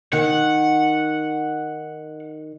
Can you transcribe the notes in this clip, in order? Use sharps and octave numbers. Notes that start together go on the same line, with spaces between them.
D#3 F#5